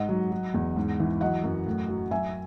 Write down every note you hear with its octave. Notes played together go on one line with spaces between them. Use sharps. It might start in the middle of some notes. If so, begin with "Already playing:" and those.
Already playing: G#2 D#5 F#5
F#3
F#3
E2
G#2
E3
F#3 D#5 F#5
F#2
A2
F#3
F#3 E5 G#5